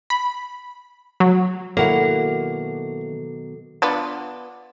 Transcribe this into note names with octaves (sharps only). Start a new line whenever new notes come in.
B5
F#3
B2 D#3 F#3 A#3 E4 A4 C#5 F#5
B3 D4 F4